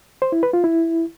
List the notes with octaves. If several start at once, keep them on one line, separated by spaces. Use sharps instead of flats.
C5
E4
B4
F4
E4